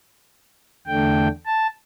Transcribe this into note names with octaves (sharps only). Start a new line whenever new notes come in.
E2 D3 A3 D4 G5
A5